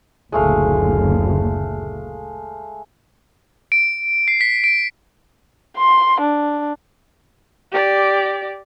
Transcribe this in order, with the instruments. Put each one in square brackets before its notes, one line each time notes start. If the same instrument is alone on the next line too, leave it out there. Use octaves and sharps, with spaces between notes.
[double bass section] F#1 D2 A#2 [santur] G#3 A3 F5
[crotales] D7
C7
B6
D7
[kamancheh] C6
D4
G4 D5